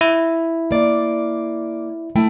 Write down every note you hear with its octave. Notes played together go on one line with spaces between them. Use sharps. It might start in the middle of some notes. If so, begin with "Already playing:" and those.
E4
A#3 D5
A3 E4 G5